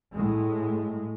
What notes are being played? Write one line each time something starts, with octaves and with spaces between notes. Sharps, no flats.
A2 G#3